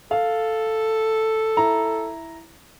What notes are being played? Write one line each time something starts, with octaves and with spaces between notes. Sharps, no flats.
A4 F5
E4 A#5